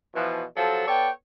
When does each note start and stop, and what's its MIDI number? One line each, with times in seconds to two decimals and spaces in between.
0.15 0.43 47
0.15 0.43 52
0.15 0.43 53
0.56 0.86 48
0.56 0.86 53
0.56 0.86 54
0.56 0.86 69
0.87 1.09 59
0.87 1.09 69
0.87 1.09 73
0.87 1.09 74
0.87 1.09 79